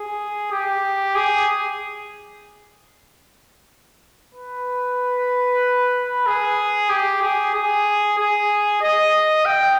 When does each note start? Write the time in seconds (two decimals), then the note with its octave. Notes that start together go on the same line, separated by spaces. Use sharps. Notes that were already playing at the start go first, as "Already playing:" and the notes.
Already playing: G#4
0.52 G4
1.15 G#4
4.34 B4
6.26 G#4
6.90 G4
7.22 G#4
7.54 G#4
8.18 G#4
8.82 D#5
9.45 G5